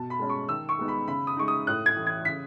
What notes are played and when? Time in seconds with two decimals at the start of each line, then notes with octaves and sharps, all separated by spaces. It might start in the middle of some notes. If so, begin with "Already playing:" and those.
Already playing: B2 A5
0.10 B5
0.19 G#3 C#4
0.30 C#6
0.49 D#3 E6
0.69 C#6
0.78 G#3 B3 D#4
0.88 B5
1.08 C#3 B5
1.27 D#6
1.37 G#3 D#4 C#6
1.48 D#6
1.67 A2 F#6
1.86 G#6
1.96 E3 A3
2.07 G#6
2.25 C#3 B6